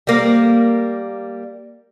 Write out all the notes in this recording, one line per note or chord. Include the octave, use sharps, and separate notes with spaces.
G3 A#3